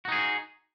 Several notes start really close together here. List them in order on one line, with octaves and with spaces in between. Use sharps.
F#4 D#4 G#4